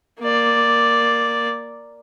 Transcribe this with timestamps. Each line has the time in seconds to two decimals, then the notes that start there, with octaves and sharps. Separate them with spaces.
0.21 A#3 D5